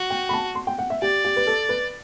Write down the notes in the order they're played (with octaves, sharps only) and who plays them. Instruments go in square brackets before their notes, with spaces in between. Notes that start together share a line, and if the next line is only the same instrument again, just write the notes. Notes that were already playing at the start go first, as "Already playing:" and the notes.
Already playing: [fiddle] F#4
[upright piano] G5
B5
A5
C6
G5
F#5
E5
[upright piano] G4 [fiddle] D5
[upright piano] G4
B4
A4
B4